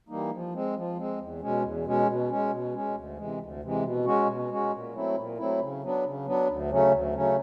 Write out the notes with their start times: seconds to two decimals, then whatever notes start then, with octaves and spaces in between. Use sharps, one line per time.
0.09 E3 G3 A#3 D#4
0.31 F3
0.53 G#3 C4
0.75 F3
0.97 G#3 C4
1.19 E2
1.41 B2 G#3 C#4
1.63 E2
1.85 B2 G#3 C#4
2.07 B2
2.30 G#3 C#4
2.52 B2
2.74 G#3 C#4
2.95 D2
3.17 C3 E3 G#3
3.39 D2
3.62 C3 E3 G#3
3.83 B2
4.05 G#3 C#4 F#4
4.27 B2
4.50 G#3 C#4 F#4
4.72 A#2
4.93 F#3 A3 C4 E4
5.16 A#2
5.38 F#3 A3 C4 E4
5.60 C#3
5.82 F#3 B3 D4
6.04 C#3
6.26 F#3 B3 D4
6.48 D2
6.70 C#3 F#3 A3 C#4
6.92 D2
7.14 C#3 F#3 A3 C#4